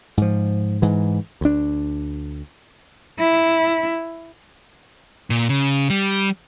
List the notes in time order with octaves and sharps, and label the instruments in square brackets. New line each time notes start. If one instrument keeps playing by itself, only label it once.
[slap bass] G#2 F3
G#2 E3
D2 D4
[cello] E4
[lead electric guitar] A#2
C#3
G3